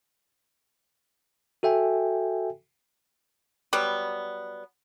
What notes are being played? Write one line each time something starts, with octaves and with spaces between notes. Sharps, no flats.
F#4 A4 E5 G5 G#5
F#3 G3 B3